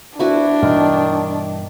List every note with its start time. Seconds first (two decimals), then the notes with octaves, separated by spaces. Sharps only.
0.19 D2 D4 E4 F#4 B4
0.62 G2 B2 D#3 E3